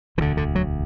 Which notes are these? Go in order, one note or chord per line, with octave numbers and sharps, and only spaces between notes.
E1 D2 D3 E3
D3
F#3